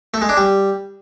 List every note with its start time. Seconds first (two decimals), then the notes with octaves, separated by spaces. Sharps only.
0.14 A3
0.22 G#3
0.29 D4
0.37 G3